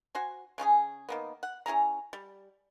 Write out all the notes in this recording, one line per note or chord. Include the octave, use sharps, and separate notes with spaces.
F#4 C5 G#5
C#3 C#4 F4 G#4
D#3 A#3 B3
F#5
C#4 E4 G#4 A#5
G3